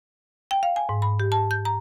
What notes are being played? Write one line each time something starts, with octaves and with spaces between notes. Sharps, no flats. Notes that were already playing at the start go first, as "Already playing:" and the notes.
G5
F5
G#5
G#2
B5
G4
A5
G6
A#5